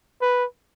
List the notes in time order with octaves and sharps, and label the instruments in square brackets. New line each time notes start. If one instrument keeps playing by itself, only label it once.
[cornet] B4